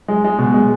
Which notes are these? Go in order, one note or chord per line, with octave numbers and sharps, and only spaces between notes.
G#3
G#3
B2
G#3